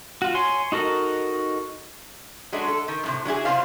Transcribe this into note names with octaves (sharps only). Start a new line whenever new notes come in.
F4 F#4
C#5 G#5 C6
D#4 F#4 A4 A#4
F#3 G#3 A3 D4
A4
D#3
F#2 A2 C3
F#3 D4 E4 G#4
C3 F3 F#3 C5 D5 F5